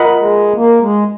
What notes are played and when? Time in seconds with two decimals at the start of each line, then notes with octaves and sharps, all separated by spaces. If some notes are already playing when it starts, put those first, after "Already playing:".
Already playing: F4 A#4 D#5 F#5 B5
0.19 G#3
0.57 A#3
0.81 G#3